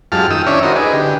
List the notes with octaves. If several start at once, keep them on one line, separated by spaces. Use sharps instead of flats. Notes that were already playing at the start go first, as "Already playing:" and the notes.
F#2 G#3 F4 G4 A5 F6
D#3 G5 D#6 E6
C#4 D4 E4 C#5 D5 E5
D#4 E4 F#4 A#4 C5 D#5
G#4 B4 D5 D#5
D3 G4